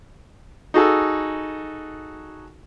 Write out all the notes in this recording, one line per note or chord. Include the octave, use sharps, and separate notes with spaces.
D#4 F#4 G#4 A4